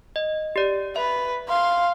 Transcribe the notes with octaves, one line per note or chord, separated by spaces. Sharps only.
D#5
G4 D5
B4 E5
F5 C6